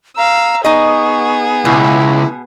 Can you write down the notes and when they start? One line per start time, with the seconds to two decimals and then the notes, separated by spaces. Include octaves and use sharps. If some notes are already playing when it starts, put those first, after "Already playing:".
0.17 F5 A#5 E6
0.65 B3 D#4 G#4 D#5 C#6
1.65 C#2 B2 E4